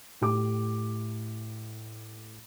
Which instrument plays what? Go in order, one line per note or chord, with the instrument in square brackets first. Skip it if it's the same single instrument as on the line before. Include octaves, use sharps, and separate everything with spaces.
[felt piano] A2 G4 D6